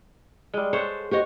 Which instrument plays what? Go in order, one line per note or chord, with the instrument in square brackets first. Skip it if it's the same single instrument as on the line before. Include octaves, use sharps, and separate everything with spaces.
[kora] G3 G#3
[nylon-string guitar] A4 [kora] C5 C#5 F#5
[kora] F#4 C#5 [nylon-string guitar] G4 C5 D#5